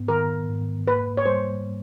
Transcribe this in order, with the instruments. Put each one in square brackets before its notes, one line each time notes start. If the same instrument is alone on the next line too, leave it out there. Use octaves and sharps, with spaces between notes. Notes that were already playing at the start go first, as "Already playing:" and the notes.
Already playing: [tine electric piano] G#2 B3
[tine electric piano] D#3 [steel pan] A#4
[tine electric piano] G#2
[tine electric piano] A#3 [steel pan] B4
[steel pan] C#5
[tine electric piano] G3 [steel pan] C5